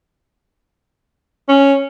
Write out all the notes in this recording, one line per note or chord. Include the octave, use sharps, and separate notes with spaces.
C#4